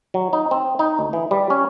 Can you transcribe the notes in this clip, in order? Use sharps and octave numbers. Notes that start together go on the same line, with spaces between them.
F#3
D#4
C4
D#4
D2
E3
G3
C#4